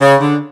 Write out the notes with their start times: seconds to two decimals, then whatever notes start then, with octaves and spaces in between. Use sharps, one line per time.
0.01 C#3
0.21 D3